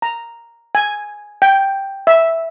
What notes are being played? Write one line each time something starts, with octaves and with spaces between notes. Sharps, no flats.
A#5
G#5
G5
E5